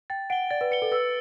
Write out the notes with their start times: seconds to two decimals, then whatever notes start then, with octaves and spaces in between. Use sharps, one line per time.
0.10 G5 A6
0.30 F#5 D7 G7
0.50 D5 A6
0.61 B4
0.71 B4 C#7 G7
0.82 A4
0.92 B4 E6